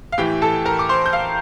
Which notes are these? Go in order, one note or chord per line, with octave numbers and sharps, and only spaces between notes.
F5
A2 E3 G4 G5
A4 A5
A#4 A#5
D6
C5 C6
G6
F5 F6